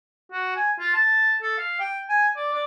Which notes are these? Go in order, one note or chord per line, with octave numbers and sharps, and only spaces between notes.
F#4
G#5
F4
A5
A4
F5
G5
G#5
D5
D5